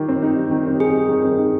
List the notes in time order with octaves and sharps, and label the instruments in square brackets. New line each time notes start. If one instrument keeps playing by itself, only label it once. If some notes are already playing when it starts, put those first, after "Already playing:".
Already playing: [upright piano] D#3 G3 D#4 [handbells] G4
[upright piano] C4
D#4
G3
D#3
C4
[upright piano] D#4 [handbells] G#4
[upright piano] G3
D#3
C4
D#4